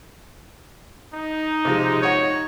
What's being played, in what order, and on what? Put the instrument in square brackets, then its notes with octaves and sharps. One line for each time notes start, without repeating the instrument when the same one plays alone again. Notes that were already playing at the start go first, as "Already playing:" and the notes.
[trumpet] D#4
[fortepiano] C3 F3 G#3
[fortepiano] D#4 F#4 [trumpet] C#5